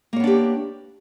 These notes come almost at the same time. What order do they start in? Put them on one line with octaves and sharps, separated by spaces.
A#3 C#5 B3 D4 G4